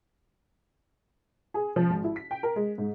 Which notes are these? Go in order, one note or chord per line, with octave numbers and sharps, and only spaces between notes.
G#4
F3
G#1
E4
B6
G5
A#4
G#3
G#2